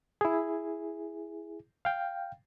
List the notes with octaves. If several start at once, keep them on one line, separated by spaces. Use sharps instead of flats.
E4 G#4
F5 G5